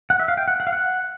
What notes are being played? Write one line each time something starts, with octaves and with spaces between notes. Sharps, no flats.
F#5
E5
F5
G5
F#5
F#5
F5
F#5